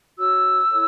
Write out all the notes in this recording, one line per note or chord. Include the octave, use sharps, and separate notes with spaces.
F#4 C#5 E6
E4 A4 C#5